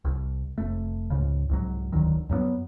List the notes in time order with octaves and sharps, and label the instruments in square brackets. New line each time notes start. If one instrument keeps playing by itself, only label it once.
[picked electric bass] C2
F1 A3
C#2 G#2 C#3
C2 G#2 F#3
E1 D2 D#3 F#3
F#2 F#3 G#3 B3